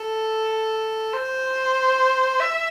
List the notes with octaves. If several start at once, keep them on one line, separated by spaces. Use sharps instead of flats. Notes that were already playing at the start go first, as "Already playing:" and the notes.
Already playing: A4
C5
E5